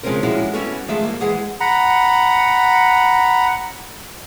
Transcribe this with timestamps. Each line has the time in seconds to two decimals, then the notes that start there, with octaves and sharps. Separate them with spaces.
0.03 C#3 F3 G#3 C4 C#4 A#4
0.23 F3 G3 G#3 C#4 E4 F#4
0.54 G3 B3 C#4 E4 F#4 A4
0.88 D#3 F3 G#3 A3 E5
1.04 G2 A#3
1.20 E3 G#3 G#4 F#5
1.60 F#5 A#5 B5